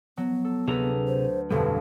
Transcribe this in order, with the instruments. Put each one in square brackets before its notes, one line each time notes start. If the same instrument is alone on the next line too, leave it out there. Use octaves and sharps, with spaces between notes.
[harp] F#3 [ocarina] B3
[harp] A4
[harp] D2 A4 B4 [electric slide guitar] C3 G#4 A#5
[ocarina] C5
[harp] G1 F2 B2 [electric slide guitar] G3 [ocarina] A4